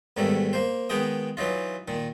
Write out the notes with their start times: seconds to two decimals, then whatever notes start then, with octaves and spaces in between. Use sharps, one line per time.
0.17 E2 G#2 D#3 G3 A3
0.53 A#3 C5
0.89 D#3 G#3 B3 G5 D#6
1.37 E3 F#3 D#4 F4
1.88 A#2 D#3